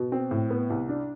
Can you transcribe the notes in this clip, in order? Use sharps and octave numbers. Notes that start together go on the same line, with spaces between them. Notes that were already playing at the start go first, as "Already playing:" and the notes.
Already playing: B2
C4
A2
B3
C2
D4